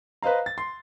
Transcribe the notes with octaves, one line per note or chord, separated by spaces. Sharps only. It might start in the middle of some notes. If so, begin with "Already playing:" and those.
B4 C5 D#5 F5 A#5
A6
C6